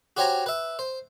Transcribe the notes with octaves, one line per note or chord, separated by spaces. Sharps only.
F#4 G4 C5 C#5 G#5 A#5
B4 E5
C5